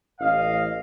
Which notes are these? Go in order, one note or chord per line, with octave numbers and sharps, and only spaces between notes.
A1 D#5 F5